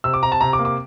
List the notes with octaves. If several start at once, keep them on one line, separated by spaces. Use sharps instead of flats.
C3 E6
D6
C3 A#5
A5
C3 A#5
D6
A#3
D6